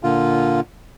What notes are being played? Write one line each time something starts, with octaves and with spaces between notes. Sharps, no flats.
A#2 D3 F4